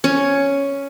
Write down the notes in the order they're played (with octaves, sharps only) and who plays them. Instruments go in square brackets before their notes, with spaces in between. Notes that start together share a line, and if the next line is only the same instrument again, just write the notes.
[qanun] C#4